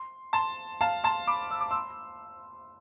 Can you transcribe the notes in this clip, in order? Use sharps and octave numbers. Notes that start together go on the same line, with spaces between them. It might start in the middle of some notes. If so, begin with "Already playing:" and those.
Already playing: C6
A5 C6
F5 A5
A5 C6
B5 D6
E6
D6
C6 E6